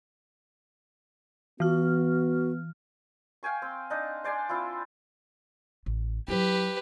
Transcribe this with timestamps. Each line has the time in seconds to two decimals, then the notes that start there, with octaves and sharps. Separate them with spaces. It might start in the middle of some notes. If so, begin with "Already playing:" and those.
1.60 E3 B3 F#4 F6
3.43 F5 G5 G#5 C#6
3.62 C4
3.90 D4 D#4
4.24 C5 D5 G#5 C6
4.49 C4 E4 F4
5.86 A1
6.28 F#3 E4 G4 B4